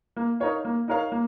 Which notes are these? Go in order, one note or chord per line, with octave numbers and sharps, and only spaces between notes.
A#3
D#4 A#4 C#5 F5
A#3
D#4 A#4 C#5 F5
A#3